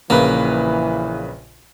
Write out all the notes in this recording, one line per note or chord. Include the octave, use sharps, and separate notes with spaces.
A#1 C#3 E3 A#3 B4